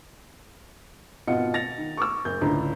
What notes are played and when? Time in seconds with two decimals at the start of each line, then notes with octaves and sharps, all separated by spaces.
1.27 G#1 B2 F4 D#5 F#5 C#7
1.54 A6 A#6 F7
1.78 D#3
1.97 C#6 D6 E6
2.25 F#1 G6
2.41 C#2 A2 D3 A#5